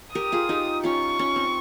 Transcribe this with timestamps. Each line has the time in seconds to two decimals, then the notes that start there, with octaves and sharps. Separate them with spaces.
0.15 G4 A#4 D#6
0.32 F4 G#4
0.49 D#4 G4
0.84 C#4 F4 C#6
1.19 C#4
1.36 C4